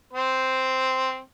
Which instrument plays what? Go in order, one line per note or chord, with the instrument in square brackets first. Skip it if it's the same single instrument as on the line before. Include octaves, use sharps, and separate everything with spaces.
[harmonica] C4 C5